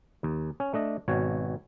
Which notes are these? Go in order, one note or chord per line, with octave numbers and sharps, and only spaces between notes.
D#2
C#4
A3 D4 D#5
G#1 B2 C#5